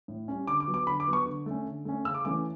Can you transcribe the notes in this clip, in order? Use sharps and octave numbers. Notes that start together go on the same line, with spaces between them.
A2
G3 C#4
D3 D6
D6
F#3 B3
D6
D3 B5
D6
F#3 B3
C#6
D3
A3 C#4
D3
A3 C#4
C#3 E6
D6
E3 A3 C#4 D6